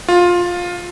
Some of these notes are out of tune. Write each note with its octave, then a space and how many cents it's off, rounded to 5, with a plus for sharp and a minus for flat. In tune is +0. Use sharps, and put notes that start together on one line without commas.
F4 +15